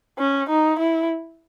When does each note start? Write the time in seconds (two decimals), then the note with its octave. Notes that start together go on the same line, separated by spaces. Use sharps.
0.19 C#4
0.49 D#4
0.79 E4